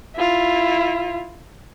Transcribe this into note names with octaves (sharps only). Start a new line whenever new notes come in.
E4 F4